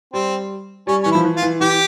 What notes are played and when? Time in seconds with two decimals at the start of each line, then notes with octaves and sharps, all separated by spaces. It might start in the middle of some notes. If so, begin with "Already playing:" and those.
0.13 G3 C4
0.87 G3 C#4
1.03 E3 C#4
1.12 E4
1.15 F3
1.25 E3
1.37 F4
1.43 E3
1.61 E3 G4